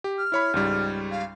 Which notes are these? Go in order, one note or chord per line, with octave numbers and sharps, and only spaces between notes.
G4
F6
E4 C#5 B5
C#2 G#2 G3
F5